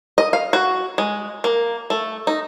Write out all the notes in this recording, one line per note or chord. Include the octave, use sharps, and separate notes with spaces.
D#5
F5
F#4
G#3
A#3
A3
D#4